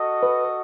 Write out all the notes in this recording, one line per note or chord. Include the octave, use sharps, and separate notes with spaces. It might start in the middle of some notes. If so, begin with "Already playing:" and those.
Already playing: F#4 A4 D#5
B4